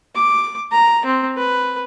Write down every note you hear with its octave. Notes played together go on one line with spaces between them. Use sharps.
D6
A#5
C4
B4